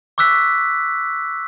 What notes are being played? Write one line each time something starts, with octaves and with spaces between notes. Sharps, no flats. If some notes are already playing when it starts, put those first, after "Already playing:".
C#6 D6 E6 F#6 B6